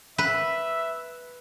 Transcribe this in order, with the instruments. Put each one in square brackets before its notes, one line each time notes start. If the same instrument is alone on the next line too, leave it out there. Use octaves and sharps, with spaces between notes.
[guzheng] B4 [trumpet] E5